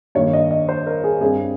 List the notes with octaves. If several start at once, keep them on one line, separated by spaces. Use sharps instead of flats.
G2 D#3 A#3 C#5
D#5
D#5
C5
A#4
G#4
G2 G3 C4 G#4